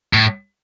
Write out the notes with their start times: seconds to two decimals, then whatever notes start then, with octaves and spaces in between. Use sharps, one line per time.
0.13 A2